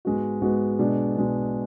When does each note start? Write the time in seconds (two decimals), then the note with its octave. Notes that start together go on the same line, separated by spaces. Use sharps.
0.05 G#2 G#3 B3 F#4
0.41 G#2 G#3 B3 F#4
0.79 B2 G#3 D4
1.17 B2 G#3 D4